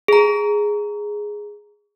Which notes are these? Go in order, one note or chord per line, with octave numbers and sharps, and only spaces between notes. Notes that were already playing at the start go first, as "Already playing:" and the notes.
G#4 A#5